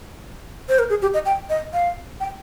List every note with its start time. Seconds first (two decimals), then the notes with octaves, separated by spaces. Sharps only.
0.69 C5
0.79 A#4
0.90 G#4
1.02 G4
1.14 D#5
1.26 G5
1.50 D#5
1.74 F5
2.20 G5